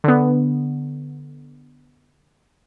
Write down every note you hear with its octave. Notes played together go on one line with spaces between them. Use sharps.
D3 B3